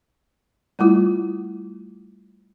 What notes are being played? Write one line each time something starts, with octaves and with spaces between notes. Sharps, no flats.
G3 A3 E4 F4